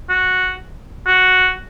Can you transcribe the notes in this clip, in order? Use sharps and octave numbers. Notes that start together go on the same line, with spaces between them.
F#4
F#4